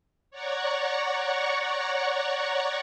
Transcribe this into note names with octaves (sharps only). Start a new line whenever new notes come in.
C#5 D5 F#5 A#5 C#6